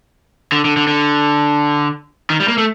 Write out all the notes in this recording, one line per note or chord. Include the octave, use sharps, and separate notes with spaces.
D3
D3
D3
D3
D#3
G3
A#3
A3